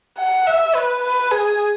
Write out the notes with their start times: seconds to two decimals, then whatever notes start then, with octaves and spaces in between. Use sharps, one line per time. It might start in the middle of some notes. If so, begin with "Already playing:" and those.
0.18 F#5
0.47 E5
0.75 B4
1.02 B4
1.31 G#4